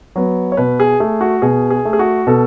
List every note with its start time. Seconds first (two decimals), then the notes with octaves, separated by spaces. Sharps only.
0.16 F#3 B3
0.52 C#5
0.57 B2 B4
0.80 G#4
1.00 A3 G#4
1.21 F#4
1.42 B2 G#4
1.70 G#4
1.85 A3
1.93 G#4
1.99 F#4
2.27 B2 A4